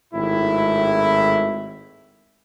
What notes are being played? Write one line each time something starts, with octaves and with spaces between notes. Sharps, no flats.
G#1 A2 E4